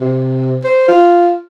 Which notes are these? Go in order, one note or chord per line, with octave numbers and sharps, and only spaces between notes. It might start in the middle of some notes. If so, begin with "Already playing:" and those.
C3
C5
F4